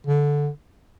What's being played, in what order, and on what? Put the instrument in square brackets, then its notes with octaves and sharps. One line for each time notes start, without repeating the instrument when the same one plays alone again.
[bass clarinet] D3